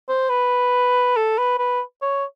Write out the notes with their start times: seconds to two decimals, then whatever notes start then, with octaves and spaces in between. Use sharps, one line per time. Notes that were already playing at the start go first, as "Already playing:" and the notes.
0.08 C5
0.29 B4
1.16 A4
1.38 B4
1.58 B4
2.02 C#5